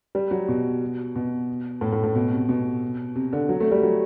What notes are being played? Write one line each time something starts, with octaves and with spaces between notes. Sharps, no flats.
G3
F#3
B2
B2
A2
A2
A2
B2
C3
B2
C3
D3
F#3
A3
G3
F#3